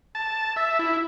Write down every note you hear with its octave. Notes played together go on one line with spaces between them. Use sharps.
A5
E5
E4